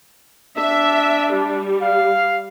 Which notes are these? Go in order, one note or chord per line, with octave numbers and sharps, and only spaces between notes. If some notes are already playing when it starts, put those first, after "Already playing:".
D4 E5
G3
F5